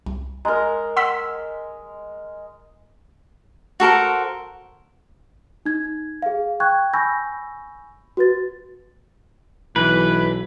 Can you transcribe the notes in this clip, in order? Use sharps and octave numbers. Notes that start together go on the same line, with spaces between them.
C2
G#3 A#4 A#5
F#5 C6 E6 B6
F#4 A4 A#4 C5
D#4 G#6
G#4 F5
G5 C#6 F#6 G#6
G#5 B5 C#6 E6 G6 A#6
F#4 B4 A6
B1 E3 B4